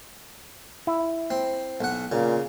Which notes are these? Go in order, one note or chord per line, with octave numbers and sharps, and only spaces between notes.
E4
C4
B1 F#5
A#2 C#3